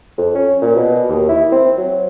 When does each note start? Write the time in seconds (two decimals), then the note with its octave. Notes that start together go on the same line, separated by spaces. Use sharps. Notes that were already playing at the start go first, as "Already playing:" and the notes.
0.18 F2
0.35 C#4
0.62 A#2
0.76 B2
1.09 D#2
1.29 E4
1.52 C4
1.78 F#3